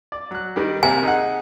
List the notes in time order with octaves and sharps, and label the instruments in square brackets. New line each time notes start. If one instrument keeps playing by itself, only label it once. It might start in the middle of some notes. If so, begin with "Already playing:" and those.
[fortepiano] D5
F#3 F#6
D#3 G3
[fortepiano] C3 A#3 E5 [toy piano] G#5
[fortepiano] D#4 G#4 F#5